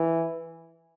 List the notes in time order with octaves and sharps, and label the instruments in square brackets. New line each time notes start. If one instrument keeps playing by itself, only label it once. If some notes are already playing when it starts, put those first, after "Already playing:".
Already playing: [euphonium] E3